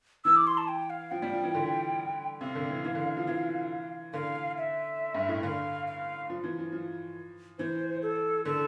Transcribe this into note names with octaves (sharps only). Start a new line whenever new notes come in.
E3 E6
D6
C6
A5
G5
F5
F3 G5
G3
F3
E3
D3
C3 F5
D3
E3
E3
D3
F3
E3
D3 F5
E5
G2
A2
D3 F5
F5
F3
E3
F3
F3
E3 C5
A4
D3 A4